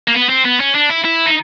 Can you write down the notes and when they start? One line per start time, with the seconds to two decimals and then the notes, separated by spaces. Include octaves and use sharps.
0.08 A#3
0.14 B3
0.29 C4
0.45 B3
0.60 C#4
0.75 D4
0.89 E4
1.04 E4
1.26 D#4